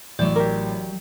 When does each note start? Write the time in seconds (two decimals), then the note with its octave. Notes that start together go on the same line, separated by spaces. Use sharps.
0.19 A1 E3 F#3 D5
0.36 G4 A#4 D6